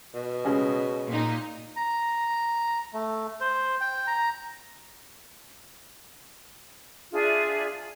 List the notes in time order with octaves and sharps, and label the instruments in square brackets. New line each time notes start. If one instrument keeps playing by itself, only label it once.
[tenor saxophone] B2
[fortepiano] C#3 G#3 C#4
[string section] A#2 D#4
[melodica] A#5
A3
C5
G5
A#5
[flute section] D4 F4 G#4 E5